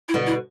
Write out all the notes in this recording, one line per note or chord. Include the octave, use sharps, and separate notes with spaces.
E4
B2 D3
E4